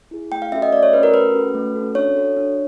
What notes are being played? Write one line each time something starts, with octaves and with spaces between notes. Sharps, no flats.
E4 G#4
A3 G5
F5
C#4 F#4 A4 E5
D#5
A3 D5
C#5
C#4 F#4 A4 B4
A#4
A3 B4
C#4 F#4 A4
A3
C#4 F#4 A4
D4 C#5
F#4 A4
D4